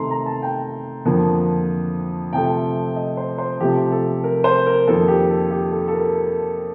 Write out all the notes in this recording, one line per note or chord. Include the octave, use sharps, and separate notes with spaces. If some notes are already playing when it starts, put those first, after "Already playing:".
Already playing: C3 D#3 A3 A#5 C6
A#5
A5
G5
F2 D3 F3 A#3
C3 F3 A3 G5
D#5
C5
C5
C3 F3 A3 G4
A4
A#4
C5
A#4
F2 D#3 A#3 A4
G4
A4
G4
A4
A4
A#4